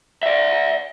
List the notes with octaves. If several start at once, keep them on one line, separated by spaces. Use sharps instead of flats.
D5 E5